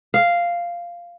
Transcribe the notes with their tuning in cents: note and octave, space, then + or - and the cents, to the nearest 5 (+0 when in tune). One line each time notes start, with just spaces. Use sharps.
F5 -5